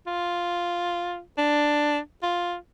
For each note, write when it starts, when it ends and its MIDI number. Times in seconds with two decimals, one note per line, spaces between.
0.07 1.20 65
1.38 1.99 62
2.23 2.56 65